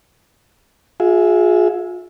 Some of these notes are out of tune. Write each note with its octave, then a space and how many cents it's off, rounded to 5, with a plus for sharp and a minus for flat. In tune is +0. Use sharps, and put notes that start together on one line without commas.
F4 +45 G#4 +5 E5 +0